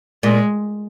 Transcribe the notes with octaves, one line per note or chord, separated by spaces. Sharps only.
A#2 G#3